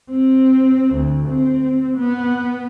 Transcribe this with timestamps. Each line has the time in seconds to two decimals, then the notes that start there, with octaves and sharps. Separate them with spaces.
0.11 C4
0.94 D2
1.29 C4
1.97 B3